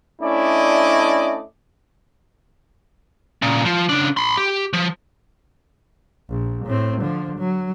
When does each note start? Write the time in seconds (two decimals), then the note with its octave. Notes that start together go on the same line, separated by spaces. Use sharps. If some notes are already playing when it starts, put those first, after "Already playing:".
0.22 A3 C#4 D4 E4 D5 D#5
3.42 A#2 C#3
3.65 F3
3.89 C#3 D4
4.17 B5 C6
4.37 G4
4.73 F3
6.30 A#1
6.66 A2 C4
7.02 D3 F3
7.38 F#3